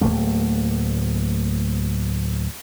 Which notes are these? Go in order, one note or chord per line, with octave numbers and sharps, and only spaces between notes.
D1 A2 A3 A#3